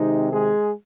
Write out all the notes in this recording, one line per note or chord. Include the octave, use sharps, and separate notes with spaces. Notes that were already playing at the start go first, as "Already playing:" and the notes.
Already playing: C3 D#3 G#3 C4 D#4
G#3 G#4